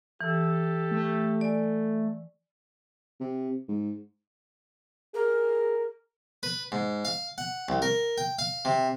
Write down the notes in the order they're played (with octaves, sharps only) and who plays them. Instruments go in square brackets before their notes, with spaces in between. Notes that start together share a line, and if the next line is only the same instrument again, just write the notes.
[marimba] E3 [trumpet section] G4 A4
[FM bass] A3
[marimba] D5 G#5
[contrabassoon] C3
G#2
[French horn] G#4 [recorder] A#4
[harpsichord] B4
G#2
F5
F#5
C2
A#4
G5
F5
C3